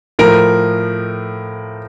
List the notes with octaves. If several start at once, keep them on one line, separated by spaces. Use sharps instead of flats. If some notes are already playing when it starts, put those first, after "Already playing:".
A2 F3 A#4